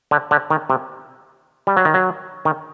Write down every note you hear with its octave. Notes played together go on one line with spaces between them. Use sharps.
D3
D3
D#3
C3
G3
F#3
D#3
F#3
D#3